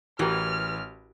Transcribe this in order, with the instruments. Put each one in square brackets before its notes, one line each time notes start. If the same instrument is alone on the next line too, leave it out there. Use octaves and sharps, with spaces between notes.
[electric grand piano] A1 [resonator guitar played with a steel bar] E3 [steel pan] F#4 G4 A#4 [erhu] F6